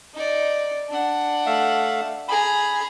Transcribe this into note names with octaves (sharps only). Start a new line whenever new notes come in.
D#4 D5
D4 F#5
A3 E5 F5
G#4 A#5 B5